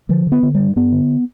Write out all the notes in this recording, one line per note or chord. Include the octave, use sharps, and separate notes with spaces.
D3 F3
D3
B3
D3
G2 G3
G2 B3
D3